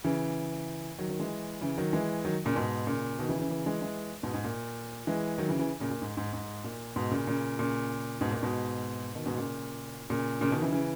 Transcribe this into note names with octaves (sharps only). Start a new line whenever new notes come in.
C#3 E3
D#3 F#3
D#3 F#3
E3 G#3
C#3 E3
D#3 F#3
E3 G#3
D#3 F#3
A#2 C#3
G#2 B2
A#2 C#3
B2 D#3
C#3 E3
C#3 E3
C#3 E3
E3 G#3
E3 G#3
G#2 B2
G#2
A#2
E3 G#3
D#3 F#3
C#3 E3
C#3 E3
A#2 C#3
A#2
G#2
G#2
G#2
A#2
G#2 B2
A#2 C#3
A#2 C#3
A#2 C#3
G#2 B2
A#2
G#2 B2
B2 D#3
G#2 B2
A#2 C#3
A#2 C#3
A#2 C#3
B2 D#3
C#3 E3
C#3 E3